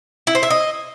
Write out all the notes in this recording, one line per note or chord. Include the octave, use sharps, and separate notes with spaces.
E4
C5
E5
D#5